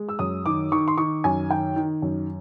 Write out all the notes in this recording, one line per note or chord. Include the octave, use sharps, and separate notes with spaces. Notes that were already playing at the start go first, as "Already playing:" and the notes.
Already playing: G#3
E6
F#2 D#6
D#3 D6
D#3 C#6
C6
D#3 C#6
F#2 G#5
D#3 G5
D#3
F#2